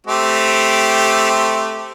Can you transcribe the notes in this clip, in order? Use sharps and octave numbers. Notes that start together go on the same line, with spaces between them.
A3 C4 G4